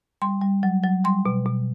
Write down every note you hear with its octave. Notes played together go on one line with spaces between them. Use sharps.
G3 C6
G3
F#3
F#3
G3 C6
B2
B2